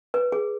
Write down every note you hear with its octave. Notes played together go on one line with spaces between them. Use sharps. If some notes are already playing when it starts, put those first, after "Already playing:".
B4
G#4